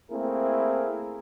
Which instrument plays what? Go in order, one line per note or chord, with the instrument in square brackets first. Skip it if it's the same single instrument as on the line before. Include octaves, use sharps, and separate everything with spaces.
[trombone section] A3 A#3 C4 E4 G#4 A#4